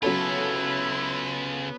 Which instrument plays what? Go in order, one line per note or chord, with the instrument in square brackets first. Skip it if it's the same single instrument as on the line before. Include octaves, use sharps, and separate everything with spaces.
[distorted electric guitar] C#3 F4 [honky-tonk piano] F#3 C#4 A4 [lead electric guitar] B3 [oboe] E4